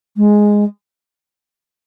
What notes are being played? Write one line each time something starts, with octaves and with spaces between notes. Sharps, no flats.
G#3